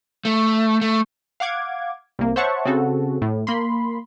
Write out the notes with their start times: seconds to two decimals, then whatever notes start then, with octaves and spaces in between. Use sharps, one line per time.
0.25 A3
0.81 A3
1.40 F5 F#5 D6 G#6
2.19 C2 A#3
2.36 C5 C#5 E5 F#5 A5 C#6
2.65 C#3 C4 F#4 A4
3.22 A2
3.47 A#3 B5 C6